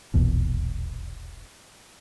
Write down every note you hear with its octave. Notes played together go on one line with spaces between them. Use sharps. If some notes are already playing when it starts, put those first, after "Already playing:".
D#1 A#1 E2 B2